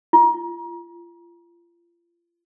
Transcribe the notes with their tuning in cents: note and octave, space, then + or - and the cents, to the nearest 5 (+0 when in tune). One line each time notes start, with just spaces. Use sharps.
F4 -30